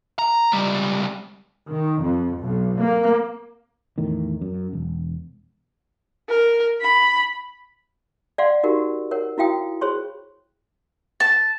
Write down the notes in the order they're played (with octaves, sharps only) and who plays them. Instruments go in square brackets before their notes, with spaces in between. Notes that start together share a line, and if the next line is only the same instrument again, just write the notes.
[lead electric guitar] A#5
C#2 G3
[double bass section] D#3
F2
B1
A#3
[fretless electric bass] E2 A2 D#3
F#2
E1
[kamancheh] A#4
B5
[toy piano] D5 F5 F#5 C6
D#4 F#4 G4 A#4
A#4 C#5 F#5
E4 F#4 F5 G5 D#6
F4 G#4 C5 C#5 C6 C#6
[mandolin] A5